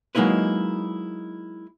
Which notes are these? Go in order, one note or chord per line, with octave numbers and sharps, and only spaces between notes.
F#3 G#3 A#3 D#4 E4 B4